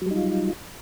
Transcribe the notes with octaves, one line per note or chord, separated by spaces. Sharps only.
F#3 G3 D#4 F4